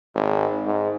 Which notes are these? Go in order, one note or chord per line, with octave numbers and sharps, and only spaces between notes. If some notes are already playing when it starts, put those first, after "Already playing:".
G#1
G#2